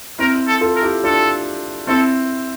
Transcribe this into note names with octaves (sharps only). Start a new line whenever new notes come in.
C4 E4 A#4
A4
F4 A4
A#4
E4 G4
D4 F4 A4
C4 E4 A4